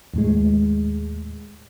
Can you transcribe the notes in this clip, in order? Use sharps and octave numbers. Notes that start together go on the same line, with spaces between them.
D#2 A2 G#3